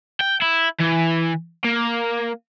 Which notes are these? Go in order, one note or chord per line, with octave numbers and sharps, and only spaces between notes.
G5
E4
E3
A#3